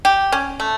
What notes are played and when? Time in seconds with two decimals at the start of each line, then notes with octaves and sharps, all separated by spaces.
0.05 G4
0.32 C#4
0.60 A3